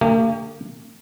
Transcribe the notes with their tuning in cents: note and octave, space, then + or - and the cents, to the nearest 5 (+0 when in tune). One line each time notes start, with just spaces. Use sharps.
D3 +0 A#3 -45 G4 +30